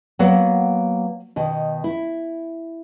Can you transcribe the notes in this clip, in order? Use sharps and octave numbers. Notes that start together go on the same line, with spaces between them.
F#3 A#3 B3 F#5
B2 D#3
E4